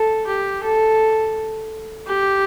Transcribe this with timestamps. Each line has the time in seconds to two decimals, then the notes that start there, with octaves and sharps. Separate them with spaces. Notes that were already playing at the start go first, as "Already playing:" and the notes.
Already playing: A4
0.27 G4
0.64 A4
2.07 G4